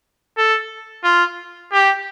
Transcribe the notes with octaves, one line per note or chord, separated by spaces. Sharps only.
A4
F4
G4